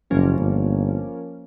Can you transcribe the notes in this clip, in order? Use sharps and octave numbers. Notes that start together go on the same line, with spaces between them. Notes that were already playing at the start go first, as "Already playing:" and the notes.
F#1 F3 A#3 C#4
G1